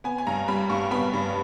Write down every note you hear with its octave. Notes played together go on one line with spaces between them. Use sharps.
B3 G#5
G#5
G2 A#5
G3 B5
G2 C#6
B3 B5
G2